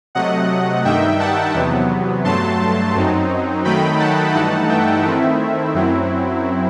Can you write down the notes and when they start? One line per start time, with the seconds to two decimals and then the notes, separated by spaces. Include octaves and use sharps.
0.15 C3 F#3 A3 D#5 F#5
0.85 G2 D#3 G3 D#4 E5 G5
1.19 F#5 A5
1.55 E2 C3 F#3 B3
2.24 G2 F#3 A3 A5 C6
2.95 F#2 F#3 C4 D#4
3.65 D#3 F#3 A3 D#4 G5 B5
4.00 F#5 A5
4.34 G2 E3 A3 D#4 F#5 A5
4.69 E5 G5
5.04 D#3 A3 C4 E4 E5
5.74 F#2 F#3 C4 E4